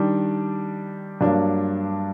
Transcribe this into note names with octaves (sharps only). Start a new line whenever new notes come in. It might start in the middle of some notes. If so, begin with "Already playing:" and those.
Already playing: D#3 G3 D4
G2 F#3 A#3 D4